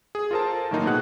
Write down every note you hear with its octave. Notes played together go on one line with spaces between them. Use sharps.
G#4
F4 A4 A#4 C5 A5
A2 D#3 F#3 A#3 D#4 F4
B2 B3 G#4 F#5 F#6